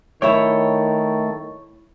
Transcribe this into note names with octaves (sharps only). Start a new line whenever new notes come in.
D#3 A3 E4 C#5 E5 G5